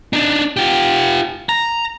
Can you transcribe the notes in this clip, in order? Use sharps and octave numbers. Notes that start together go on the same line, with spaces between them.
D4 D#4
F4 G4
A#5